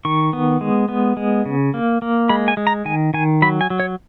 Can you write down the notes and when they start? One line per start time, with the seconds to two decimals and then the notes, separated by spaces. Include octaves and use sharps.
0.05 D#3 C#6
0.33 B3
0.61 G#3
0.89 B3
1.17 G#3
1.46 C#3
1.74 A#3
2.02 A#3
2.29 G#3 B5
2.48 G#5
2.57 G#3
2.67 A#5
2.85 D#3 G#5
3.14 D#3 G#5
3.42 F#3 B5
3.61 G#5
3.70 F#3
3.80 C#5